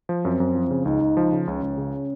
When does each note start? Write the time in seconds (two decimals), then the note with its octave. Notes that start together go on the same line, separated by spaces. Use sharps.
0.09 F3
0.25 F#2 C4
0.40 F#2
0.55 F3
0.71 C#3
0.85 C#2 D#4
1.01 C#2
1.17 F3
1.32 C#3
1.47 C#2 C#4
1.63 C#2
1.78 C#3